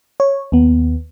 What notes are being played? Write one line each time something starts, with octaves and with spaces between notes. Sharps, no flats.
C#5
D#2 B3